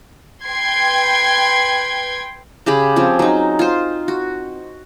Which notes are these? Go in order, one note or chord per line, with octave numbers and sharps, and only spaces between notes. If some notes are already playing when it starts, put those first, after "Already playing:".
B4 G5 C6 G#6
C#3 G4 G#4 B5
F3 C4 C#4
F#3 D#4
F4 C5
F#4